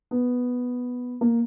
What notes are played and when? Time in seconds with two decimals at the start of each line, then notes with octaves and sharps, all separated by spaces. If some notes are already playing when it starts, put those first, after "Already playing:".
0.11 B3
1.21 A#3